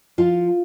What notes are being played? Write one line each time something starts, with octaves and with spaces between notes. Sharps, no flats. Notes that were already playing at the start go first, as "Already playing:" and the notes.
F3 F4